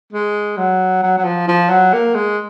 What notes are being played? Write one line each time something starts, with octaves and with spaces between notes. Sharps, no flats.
G#3
F#3
F#3
F#3
F3
F3
F#3
A#3
G#3